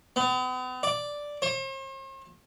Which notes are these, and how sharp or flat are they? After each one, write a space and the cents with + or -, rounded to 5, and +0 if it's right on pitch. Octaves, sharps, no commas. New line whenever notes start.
B3 +45
D5 +0
C5 +45